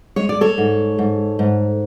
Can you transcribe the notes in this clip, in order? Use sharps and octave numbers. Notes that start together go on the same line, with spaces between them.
G#3 C#5
D5
A4 C#5
G#2
G#2
G#2